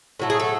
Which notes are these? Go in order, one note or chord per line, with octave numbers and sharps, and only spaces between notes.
A2 F#3 A3
G#4
A4